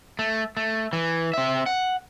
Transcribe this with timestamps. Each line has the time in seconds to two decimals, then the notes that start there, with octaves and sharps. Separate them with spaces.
0.19 A3
0.57 A3
0.93 E3
1.34 C4 E5
1.66 F#5